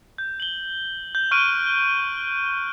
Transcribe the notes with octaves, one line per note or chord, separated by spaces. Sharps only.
G6
F#7 G7
G6
C#6 F6 F#6 D7 D#7